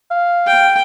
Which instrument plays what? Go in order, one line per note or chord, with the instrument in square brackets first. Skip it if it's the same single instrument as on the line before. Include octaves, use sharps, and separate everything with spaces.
[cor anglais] F5
[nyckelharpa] G5